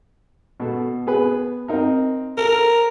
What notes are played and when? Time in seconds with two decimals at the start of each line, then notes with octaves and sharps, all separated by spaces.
0.60 B2 A4
1.07 B3 G#4 B4
1.68 C4 D#4 A#4
2.38 A4 A#4